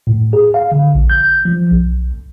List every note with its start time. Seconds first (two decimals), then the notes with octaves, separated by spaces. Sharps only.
0.07 A2
0.33 G#4
0.54 F5
0.72 D3
0.95 A#1
1.10 G6
1.45 F3
1.71 B1